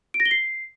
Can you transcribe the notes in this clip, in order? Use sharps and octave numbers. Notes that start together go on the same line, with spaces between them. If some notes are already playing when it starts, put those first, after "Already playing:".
D7
A#6
G7
C7